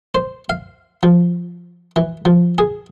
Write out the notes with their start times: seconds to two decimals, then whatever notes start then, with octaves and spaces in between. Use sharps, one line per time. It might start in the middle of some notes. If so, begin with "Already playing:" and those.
0.15 C5
0.49 F5
1.03 F3
1.96 E3
2.25 F3
2.58 G#4